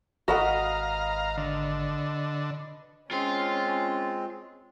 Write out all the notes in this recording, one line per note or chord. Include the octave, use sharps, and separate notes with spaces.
G#1 F#4 A4 B4 D#5 F5 F#5 A#5
D3
G#3 C4 C#4 F4 C6